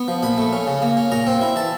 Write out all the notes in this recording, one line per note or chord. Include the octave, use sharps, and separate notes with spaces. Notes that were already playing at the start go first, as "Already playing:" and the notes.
Already playing: B3
F3
A#2 B5
A3
C#4
C#3
A#3
C#4
A#2 A#5
C4
E4
E3 A5